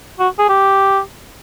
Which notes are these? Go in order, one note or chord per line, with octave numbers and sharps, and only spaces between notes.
F#4
G#4
G4